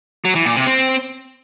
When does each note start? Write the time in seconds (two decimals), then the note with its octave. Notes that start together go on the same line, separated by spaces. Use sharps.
0.25 F#3
0.35 E3
0.46 A#2
0.56 C3
0.67 C4